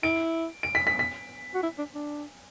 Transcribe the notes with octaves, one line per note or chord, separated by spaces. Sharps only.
E4 D7
D7
B6
B6
B6
F#4
E4
D4
D4